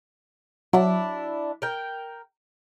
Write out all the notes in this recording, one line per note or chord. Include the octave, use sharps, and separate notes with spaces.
F#3 D4 E4
A#4 G5